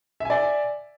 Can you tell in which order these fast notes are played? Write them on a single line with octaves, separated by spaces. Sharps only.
E5 G#5 D5